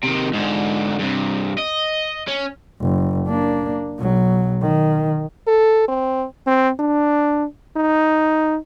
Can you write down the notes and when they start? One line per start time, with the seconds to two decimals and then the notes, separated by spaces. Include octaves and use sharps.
0.04 C3 D#3
0.34 G#2 D3
0.99 G2 C3
1.58 D#5
2.28 C#4
2.80 F#1
3.28 A#3 D4
3.99 B1 F#3
4.62 D#3
5.47 A4
5.88 C4
6.47 C4
6.80 D4
7.76 D#4